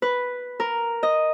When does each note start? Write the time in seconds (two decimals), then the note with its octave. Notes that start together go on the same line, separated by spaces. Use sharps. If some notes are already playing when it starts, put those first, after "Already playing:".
0.02 B4
0.60 A#4
1.03 D#5